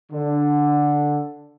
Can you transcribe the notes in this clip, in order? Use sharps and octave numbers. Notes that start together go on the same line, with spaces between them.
D3